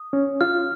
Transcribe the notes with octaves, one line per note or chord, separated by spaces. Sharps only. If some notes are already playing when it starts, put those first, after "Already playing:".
Already playing: D#6
C#4
F4 F6